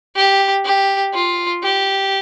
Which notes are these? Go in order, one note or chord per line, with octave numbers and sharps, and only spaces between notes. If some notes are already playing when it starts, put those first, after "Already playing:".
G4
G4
F4
G4